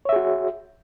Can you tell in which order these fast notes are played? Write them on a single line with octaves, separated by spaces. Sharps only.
C#5 E5 G#4 F#4